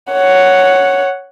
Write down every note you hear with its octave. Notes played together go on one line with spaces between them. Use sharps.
C#5 F#5